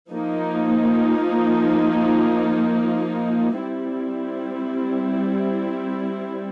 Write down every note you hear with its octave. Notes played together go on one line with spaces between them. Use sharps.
F3 A#3 D#4
G3 C4 E4